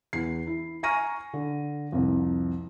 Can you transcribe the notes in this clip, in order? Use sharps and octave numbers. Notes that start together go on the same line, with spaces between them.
E2 C7
E4
G#5 A#5 C#6 F6 A#6 D#7
D3
C2 F2